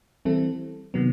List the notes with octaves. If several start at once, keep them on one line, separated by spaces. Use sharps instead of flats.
E3 G3 C4 E4 A4
C3 D#3 F#3 B3